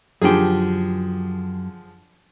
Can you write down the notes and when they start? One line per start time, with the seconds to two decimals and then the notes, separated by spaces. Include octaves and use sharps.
0.22 F#2 D3 F3 G4 G#4